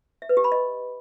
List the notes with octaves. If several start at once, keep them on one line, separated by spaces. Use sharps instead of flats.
E5
B4
G4
B5
D#5